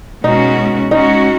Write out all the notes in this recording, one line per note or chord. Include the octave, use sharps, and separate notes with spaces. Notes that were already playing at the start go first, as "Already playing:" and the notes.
B2 G#3 C#4 D#4 F#4
G#3 C#4 D#4 F#4